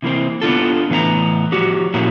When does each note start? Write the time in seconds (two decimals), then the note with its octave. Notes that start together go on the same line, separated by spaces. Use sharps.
0.02 C3 E3 A#3 C4
0.42 B3 D4 F4 A4
0.90 A2 E3 B3 E5 A#5
1.52 F3 F#4 G4
1.94 A#2 F3 A#3 C#4 E4 F#4